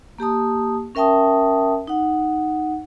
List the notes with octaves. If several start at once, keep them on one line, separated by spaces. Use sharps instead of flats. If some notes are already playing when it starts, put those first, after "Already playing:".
A#3 G4 A5 D#6
C#4 A#4 E5 G5 A5 D#6
D#4 F#5